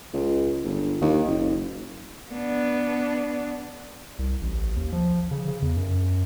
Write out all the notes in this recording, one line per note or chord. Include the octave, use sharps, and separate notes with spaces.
C#2
G1
D#2
F#1
B3 D4
C2
A1
D#2
F3
C#3
C#3
E2
F#2